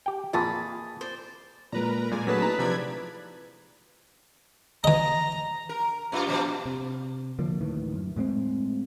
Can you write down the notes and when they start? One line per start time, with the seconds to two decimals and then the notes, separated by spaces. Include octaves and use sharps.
0.06 G4 G5
0.33 F2 A#2 E3 G#4 A5 B5
1.01 C5 D5
1.72 A#2 G#3 A#4 B4 A#5
2.11 A#2 G#3 D5 G#5
2.27 F#3 A3 D4 G#4 B4 A5 B6
2.42 D#4 E4 A#5
2.59 C3 F3 D5 B5 G#6
4.84 E3 D#5 A#5
5.69 A#4
6.12 F#2 D#4 F4
6.27 A#2 F3 G3
6.66 C3
7.39 D3 F3 A#3
7.60 D2 A2 D#3 E3
7.94 F#2
8.16 A2 G#3 A#3 C4